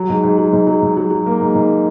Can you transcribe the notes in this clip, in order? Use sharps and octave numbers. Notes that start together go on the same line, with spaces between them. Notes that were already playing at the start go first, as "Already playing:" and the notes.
Already playing: F#3
G#2
G#2
F#3
G#2
F#3
G#2
F#3
F#3
A#3
G#2
G#2